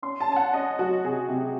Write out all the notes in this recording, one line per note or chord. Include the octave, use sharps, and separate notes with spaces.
C#4 C6
A5
C#4 G#5
F#5
C#4 D#5
F#3 F#4
C3 G#4
C3